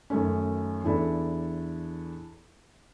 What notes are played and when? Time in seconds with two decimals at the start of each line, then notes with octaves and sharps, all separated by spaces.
0.10 F#2 D#3 A3 C#4
0.84 E2 D4 E4 A4